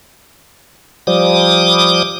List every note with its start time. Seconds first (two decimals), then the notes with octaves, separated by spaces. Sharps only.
1.07 F3 G3 D6 D#6